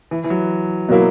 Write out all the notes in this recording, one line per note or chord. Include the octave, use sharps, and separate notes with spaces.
E3
E3
F#3
B2 F#3 A#3 E4